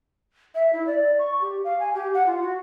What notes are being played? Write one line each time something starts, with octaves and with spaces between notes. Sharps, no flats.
E5
E4
D5
C#6
G4
F5
G#5
G4
F#5
F4
F#4